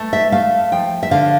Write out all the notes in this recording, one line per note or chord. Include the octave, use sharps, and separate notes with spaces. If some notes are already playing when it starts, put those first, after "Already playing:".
Already playing: A3
E5
A3 F5
F3 G5
E5
D3 F5